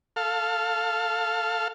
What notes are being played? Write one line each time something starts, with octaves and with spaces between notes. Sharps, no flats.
A4 F5